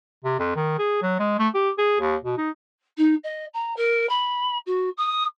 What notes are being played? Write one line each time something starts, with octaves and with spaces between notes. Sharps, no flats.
C3
F2
D#3
G#4
F#3
G#3
A3
G4
G#4
D#2
B2
D#4
D#4
D#5
A#5
A#4
B5
F#4
D#6